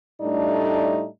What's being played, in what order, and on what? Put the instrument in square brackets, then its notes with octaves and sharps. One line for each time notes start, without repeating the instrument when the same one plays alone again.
[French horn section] A2 G3 A3 D4 D#4 D5